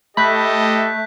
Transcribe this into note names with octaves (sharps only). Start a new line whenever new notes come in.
A3 G4 A4 D#5 B5 F#6 G6 B6